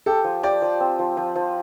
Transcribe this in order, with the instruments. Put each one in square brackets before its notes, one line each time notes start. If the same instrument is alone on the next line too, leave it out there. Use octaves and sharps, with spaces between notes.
[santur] G4 [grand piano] A4
[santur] F3
[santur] G4 [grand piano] D5
[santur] F3
C4
F3
F3
F3